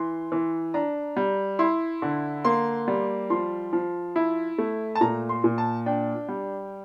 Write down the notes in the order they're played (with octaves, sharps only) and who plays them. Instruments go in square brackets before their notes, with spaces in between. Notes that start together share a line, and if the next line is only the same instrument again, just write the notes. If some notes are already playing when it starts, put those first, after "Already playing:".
Already playing: [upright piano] E3 C6
E3
D4 A#5
G3
E4 C6
D3
A#3 C6
G3
F3 C6
F3
E4
A3
A5
A#2 A#5
C6
A#2
A5
D4 G5
G3